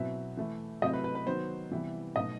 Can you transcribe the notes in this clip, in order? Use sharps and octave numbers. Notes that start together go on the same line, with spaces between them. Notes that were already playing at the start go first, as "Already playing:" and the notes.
Already playing: B2 F#3 C4 E4 E5
E3 A3 E4
C3 F#3 A3 C4 E4 D#5
B4
B4
B4
D#3 F#3 B3 C5
C3 E3 G3 B3 E4
B2 F#3 A3 D#4 D#5